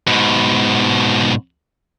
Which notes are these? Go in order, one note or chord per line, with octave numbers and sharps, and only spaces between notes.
G#2 B2